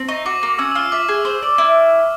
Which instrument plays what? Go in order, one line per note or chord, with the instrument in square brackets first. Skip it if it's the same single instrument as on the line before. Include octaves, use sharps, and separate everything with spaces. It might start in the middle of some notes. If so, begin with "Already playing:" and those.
Already playing: [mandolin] C4
[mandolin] D#4 [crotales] C#6
[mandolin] F#4 [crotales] D6
[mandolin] A#3 [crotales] D6
[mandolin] C#4 [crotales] E6
[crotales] E6
[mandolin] F4 [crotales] F6
[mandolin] E5 [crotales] D6
[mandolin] G#4
C5
D5
E4